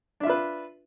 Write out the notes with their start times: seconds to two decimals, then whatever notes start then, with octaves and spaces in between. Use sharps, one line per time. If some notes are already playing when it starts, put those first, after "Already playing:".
0.20 D4
0.23 E5
0.26 F4
0.29 B4